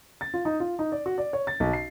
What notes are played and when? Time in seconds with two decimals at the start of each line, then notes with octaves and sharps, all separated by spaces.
0.21 A6
0.34 F4
0.45 D#4
0.60 F4
0.79 D#4
0.92 D5
1.06 F#4
1.18 D5
1.33 C#5
1.47 A6
1.60 B1
1.73 C7